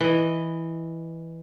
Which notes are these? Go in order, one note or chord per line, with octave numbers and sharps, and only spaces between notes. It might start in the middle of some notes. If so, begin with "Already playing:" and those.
E3 D#5